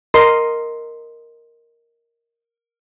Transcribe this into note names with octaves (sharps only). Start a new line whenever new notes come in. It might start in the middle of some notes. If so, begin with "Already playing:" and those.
A#4 D#5 C6